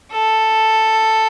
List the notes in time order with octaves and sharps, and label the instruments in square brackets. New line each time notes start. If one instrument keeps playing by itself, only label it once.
[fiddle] A4